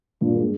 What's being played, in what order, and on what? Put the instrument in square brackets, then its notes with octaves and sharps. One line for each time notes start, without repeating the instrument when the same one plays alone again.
[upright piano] G2 [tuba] A#2
[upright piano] G#3